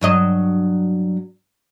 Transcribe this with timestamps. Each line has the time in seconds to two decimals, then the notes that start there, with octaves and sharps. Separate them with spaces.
0.01 G2 F#3 D#5